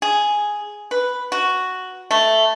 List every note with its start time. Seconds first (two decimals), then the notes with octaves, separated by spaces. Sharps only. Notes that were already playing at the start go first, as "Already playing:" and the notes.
0.02 G#4
0.91 B4
1.32 F#4
2.11 A3